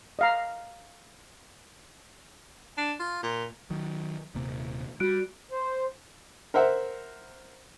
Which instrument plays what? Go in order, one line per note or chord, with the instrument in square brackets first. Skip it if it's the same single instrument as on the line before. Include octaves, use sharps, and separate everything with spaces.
[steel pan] D#5 F5 A#5
[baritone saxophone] D4
F4
A#2
[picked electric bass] D#3 F#3
D#1 C3 A#3
[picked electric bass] G3 [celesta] F#4 F#6 D7
[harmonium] C5
[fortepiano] A#4 C5 E5 F#5